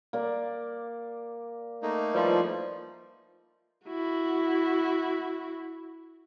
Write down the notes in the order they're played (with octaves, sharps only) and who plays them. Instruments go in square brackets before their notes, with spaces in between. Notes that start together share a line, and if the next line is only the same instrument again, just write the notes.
[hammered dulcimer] A#3 D5
[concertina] A3 A#3 D#4
[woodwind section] E3 F3 G3
[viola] E4 F#4